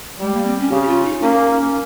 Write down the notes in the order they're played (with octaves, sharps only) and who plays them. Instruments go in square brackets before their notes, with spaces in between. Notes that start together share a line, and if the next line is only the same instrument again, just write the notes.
[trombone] G3 [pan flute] G#3
[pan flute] A#3
C4
C#4
[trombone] C#3 [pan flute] G4
[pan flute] G4
F4
D#4
[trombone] A#3 [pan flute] C#4